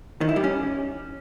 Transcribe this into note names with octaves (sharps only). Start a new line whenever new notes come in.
D#3
E4
G3
C#4